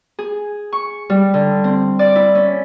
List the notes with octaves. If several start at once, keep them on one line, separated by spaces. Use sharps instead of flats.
G#4
C#6
G3
D3
C4
D5
E4
C#4